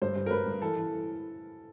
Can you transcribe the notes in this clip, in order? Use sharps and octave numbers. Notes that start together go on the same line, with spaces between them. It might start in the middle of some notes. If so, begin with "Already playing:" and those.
G2 C5
G2
A#4
G2 B4
G2
E3 A4
E3